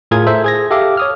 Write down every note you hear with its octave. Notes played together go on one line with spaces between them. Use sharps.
A2 F4 G#4 A#4 D#6 G#6
A4 C5 E5
G#4 G#6 A#6
G4 A4 E5 F5 D6
C#5 D#6 F6